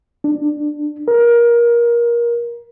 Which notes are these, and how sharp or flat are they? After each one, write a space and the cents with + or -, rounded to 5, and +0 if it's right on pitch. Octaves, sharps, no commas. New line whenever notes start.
D4 +15
A#4 +20